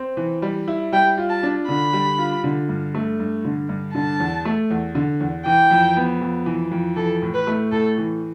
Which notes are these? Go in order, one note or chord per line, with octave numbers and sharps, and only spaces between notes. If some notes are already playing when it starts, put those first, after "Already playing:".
Already playing: C4
E3
G3
E4
G3 G5
F4
A5
D4
D3 B5
G3
F4
D3
G2
A3
G2
D3
G2
D3 A5
E2
A3
E2
D3
E2
E3 G5
F2
B3
F2
E3
F2
E3 A4
A2
B4
A3
A2 A4
E3